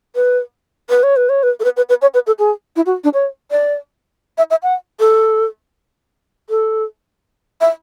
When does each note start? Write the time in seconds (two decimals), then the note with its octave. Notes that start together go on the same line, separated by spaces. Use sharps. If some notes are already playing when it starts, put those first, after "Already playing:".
0.15 B4
0.89 B4
1.03 C#5
1.16 B4
1.29 C#5
1.43 B4
1.60 A4
1.64 B4
1.77 B4
1.89 B4
2.02 C#5
2.14 B4
2.27 A4
2.39 G#4
2.76 E4
2.86 F#4
3.04 D4
3.13 C#5
3.51 D5
4.38 E5
4.50 E5
4.63 F#5
5.00 A4
6.50 A4
7.61 E5